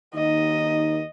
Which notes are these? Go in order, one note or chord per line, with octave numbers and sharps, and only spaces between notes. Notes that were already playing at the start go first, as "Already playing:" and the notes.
D#2 D#3 D#4 D#5